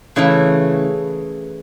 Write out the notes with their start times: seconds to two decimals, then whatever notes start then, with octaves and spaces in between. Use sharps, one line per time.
0.16 C#3 E3 A3